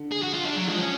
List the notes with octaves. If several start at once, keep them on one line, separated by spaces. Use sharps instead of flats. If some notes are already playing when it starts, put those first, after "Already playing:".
Already playing: D3
G#4
F#4
F4
D4
F#3
F3 G#3
C#4